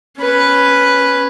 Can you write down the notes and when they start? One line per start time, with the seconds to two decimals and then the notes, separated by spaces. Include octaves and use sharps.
0.20 C#4 B4